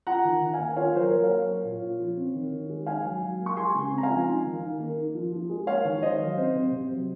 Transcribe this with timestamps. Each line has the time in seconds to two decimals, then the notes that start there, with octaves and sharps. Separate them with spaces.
0.07 F4 F#5 A#5
0.24 D#3
0.42 D#3
0.53 F5 G#5
0.59 A#3
0.77 F4 C#5 F5
0.94 F#3 C5
1.00 A#4 C#5
1.12 F#3
1.24 C#5 F5
1.29 A#3
1.47 A#3
1.64 A#2
1.82 F4
1.99 F3
2.17 C4
2.34 D#3
2.52 D#3
2.69 G#3
2.86 D#4 F5 G#5
3.04 F#3
3.22 F#3
3.39 A#3
3.46 C#6
3.57 G#3 G#5 C6
3.74 C#3
3.92 C4
3.98 A#5
4.03 F5 G#5
4.10 F3
4.27 D#4
4.44 D#3
4.62 D#3
4.80 A#3
4.97 D#4
5.15 F3
5.33 F3
5.50 G#3
5.67 A#3 C#5 F5
5.85 D#3
6.02 D#3 C5 D#5
6.20 F#3
6.37 C4 C5
6.54 C3
6.72 C3
6.90 F#3